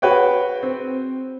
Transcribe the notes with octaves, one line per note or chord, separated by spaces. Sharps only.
F#4 G#4 B4 C#5 G5
C4